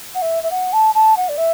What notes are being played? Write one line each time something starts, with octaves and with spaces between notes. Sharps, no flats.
F#5
E5
E5
F#5
A5
A5
F#5
D5
E5